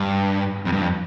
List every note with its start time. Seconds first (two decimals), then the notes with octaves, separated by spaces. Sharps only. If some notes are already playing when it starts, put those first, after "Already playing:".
Already playing: G2
0.65 F2
0.72 G2
0.81 F2